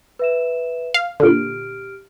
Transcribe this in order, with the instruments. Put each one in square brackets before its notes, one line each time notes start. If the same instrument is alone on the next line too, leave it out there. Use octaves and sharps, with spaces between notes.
[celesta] B4 E5 E7
[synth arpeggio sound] F5
[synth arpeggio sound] A#2 D3 [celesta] G4 F6 D7